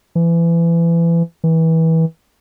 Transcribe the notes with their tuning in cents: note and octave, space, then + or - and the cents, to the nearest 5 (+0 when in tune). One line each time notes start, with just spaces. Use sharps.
E3 +30
E3 -25